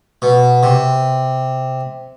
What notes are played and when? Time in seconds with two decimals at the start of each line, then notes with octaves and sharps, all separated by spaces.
0.22 B2
0.63 C3